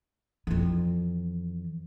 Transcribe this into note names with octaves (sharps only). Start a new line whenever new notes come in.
F2 E3